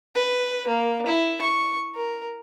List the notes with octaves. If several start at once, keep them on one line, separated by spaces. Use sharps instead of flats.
B4
A#3
E4
C#6
A#4